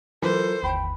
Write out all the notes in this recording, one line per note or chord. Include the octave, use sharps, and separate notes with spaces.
E3 F#3 F4 A4 A#4 C5
G1 D#2 G5 B5